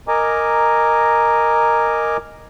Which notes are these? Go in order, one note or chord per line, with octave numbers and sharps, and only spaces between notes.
A#4 D#5 G#5 A#5 D6